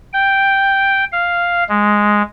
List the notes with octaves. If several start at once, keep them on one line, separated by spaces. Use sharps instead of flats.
G5
F5
G#3